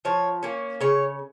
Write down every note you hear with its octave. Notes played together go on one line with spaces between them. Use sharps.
F3 C#5
A#3 C#4
C#3 C#5